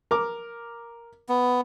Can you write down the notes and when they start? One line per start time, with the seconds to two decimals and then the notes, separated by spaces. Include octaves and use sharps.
0.11 A#4 D6
1.29 B3